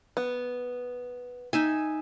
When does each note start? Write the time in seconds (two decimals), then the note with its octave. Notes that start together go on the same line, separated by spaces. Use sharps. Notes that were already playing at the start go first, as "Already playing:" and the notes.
0.17 B3
1.53 D#4 E5 G#5